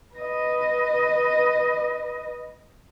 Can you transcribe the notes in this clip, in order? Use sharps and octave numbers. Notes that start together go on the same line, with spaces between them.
B4 D#5